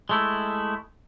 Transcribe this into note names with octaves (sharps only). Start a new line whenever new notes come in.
G#3 A3 E4